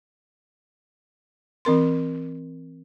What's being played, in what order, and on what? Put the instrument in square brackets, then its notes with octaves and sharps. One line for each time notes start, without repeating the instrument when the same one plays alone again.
[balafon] E3 C4 A#4 C6